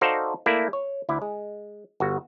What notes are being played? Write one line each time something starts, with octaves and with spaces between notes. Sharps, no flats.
D#4 F#4 A4 C5 D5 F5
A3 A#3 E4 D5
C#5
D2 E4 D5
G#3
G1 F#4